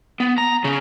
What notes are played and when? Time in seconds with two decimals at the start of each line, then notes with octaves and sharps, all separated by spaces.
0.20 B3
0.38 A#5
0.64 C#3